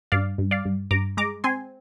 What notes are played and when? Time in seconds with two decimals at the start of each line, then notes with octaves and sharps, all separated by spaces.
0.12 G2 D5 F5
0.38 G2
0.51 D5 F5
0.65 G2
0.91 G2 A#5 D6
1.17 G#3 A#5 D6
1.44 C4 G#5 C6